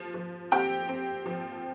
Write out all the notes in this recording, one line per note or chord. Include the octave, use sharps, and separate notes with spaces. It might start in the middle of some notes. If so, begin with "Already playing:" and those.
Already playing: F3
F3
C4 G4 G5
C4
F3